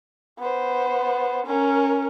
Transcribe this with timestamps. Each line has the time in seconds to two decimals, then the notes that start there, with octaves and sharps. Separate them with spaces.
0.39 B3 C5
1.46 C#4 A#4